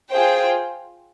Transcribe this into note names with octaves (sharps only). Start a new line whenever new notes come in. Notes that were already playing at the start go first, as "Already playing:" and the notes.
F4 G#4 C5 G5